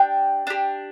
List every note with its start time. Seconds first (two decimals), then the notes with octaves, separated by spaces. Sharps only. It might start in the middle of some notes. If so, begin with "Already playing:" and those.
Already playing: D4 G4 G5
0.47 D4 G4